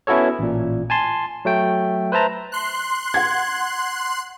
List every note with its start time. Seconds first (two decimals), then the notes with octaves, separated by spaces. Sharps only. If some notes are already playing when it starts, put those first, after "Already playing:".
0.07 B3 C#4 E4 F#4 A4 C#5
0.39 A1 A#2
0.90 G#5 A5 C6
1.45 F#3 A3 G5
2.12 B4 C5 E5 A5 A#5
2.52 C6 F#6
3.14 F#5 G#6